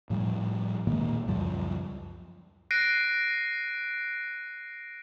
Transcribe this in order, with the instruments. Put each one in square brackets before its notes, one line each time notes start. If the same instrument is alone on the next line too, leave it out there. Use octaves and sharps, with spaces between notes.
[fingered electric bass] A2 F3 G3
A#2 D#3 G#3 A#3
C#2 F#2 F3 G3
[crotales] F#6 A#6 C7 D7 D#7